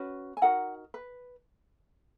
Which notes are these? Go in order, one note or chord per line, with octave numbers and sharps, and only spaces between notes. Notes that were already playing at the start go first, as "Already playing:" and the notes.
Already playing: C#4 F#4 B4
G#5
D#4 F#4 A#4 F#5
B4